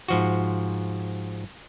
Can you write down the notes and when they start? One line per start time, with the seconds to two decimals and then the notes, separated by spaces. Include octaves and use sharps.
0.08 G#2 F3 F#4